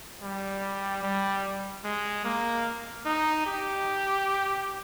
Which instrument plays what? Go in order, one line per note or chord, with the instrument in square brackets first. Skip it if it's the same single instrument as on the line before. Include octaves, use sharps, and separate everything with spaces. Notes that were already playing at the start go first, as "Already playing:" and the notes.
[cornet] G3
G3
G#3
A#3
D#4
G4